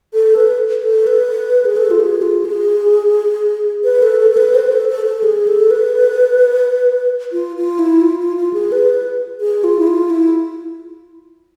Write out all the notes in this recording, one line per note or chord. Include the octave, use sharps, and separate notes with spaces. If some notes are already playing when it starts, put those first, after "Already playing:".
A4
B4
A4
B4
G#4
A4
F4
G#4
F4
G#4
B4
A4
A4
A4
B4
C5
A4
A4
A4
G#4
A4
B4
F4
F4
E4
F4
F4
F4
G#4
B4
G#4
F4
E4
F4
E4